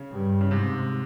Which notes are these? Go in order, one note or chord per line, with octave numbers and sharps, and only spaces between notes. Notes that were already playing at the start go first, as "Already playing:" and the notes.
Already playing: C#3
G2
C#3
G#2 C3